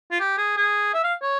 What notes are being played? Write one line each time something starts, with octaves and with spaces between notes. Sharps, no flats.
F4
G4
G#4
G#4
E5
F5
C#5